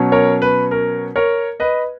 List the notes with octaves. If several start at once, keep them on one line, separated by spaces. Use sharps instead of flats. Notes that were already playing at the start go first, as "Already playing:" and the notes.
Already playing: B2 F#3 C#4
A#4 C#5
B4
A#4
A#4 C#5
B4 D#5